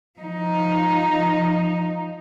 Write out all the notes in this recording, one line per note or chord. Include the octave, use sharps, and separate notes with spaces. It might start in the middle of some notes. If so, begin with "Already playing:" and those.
F3 D#4